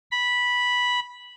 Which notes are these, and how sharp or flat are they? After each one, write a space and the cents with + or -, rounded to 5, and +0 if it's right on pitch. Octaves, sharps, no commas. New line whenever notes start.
B5 -10